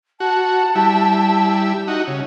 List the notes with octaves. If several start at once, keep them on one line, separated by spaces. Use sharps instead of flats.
F#4 A5
G3 E4
D#4 F#4
C#3